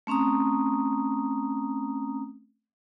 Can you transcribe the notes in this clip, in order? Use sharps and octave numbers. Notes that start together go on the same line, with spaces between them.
A3 C4 C#4 A#5 D#6